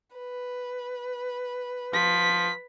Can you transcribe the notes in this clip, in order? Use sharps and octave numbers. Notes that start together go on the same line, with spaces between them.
B4
F3 B6